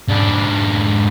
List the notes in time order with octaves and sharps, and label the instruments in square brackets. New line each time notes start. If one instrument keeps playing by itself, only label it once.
[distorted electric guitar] G#2 D4